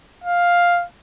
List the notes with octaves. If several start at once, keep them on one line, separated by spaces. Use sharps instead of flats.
F5